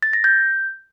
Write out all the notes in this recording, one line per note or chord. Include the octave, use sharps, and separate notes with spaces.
A6
A#6
G6